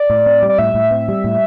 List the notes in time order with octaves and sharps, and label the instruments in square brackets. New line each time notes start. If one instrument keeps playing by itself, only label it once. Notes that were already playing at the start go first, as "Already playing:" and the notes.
Already playing: [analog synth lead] D5
[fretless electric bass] A2
C4
G3
[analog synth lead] D5
[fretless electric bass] A2 [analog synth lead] E5
[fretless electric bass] A2
C4
G3
A2